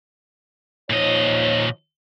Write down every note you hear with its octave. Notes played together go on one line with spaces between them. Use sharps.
A#2 F3 D#4 C#5 D#5